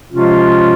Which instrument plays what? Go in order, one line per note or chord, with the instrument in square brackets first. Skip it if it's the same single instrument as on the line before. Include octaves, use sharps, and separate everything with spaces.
[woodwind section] C3 F3 G#3 C#4 F4